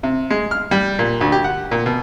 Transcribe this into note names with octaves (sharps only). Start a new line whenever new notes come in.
C3
G#3
F6
G3
A#2
D2
G4
F#5
A#2
B2